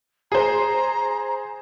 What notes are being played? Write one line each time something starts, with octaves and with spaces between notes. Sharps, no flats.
G#4 C5 A#5